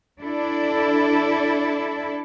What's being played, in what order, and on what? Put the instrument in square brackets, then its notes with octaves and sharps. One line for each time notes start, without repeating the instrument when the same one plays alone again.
[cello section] D4 E4 A4